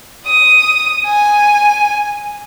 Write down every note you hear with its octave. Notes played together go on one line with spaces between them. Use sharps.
D#6
G#5